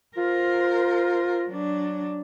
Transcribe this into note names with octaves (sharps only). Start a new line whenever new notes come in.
F4 A#4 C5
F#3 D4